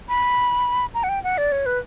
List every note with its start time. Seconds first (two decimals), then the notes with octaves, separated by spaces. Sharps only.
0.09 B5
0.94 A#5
1.04 F#5
1.09 G5
1.24 F#5
1.38 D5
1.52 C#5
1.66 B4